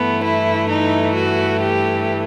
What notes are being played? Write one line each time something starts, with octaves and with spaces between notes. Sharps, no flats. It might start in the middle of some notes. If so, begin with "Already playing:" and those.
Already playing: G2 E3 A3 B3
E4
D#4
F#4
G4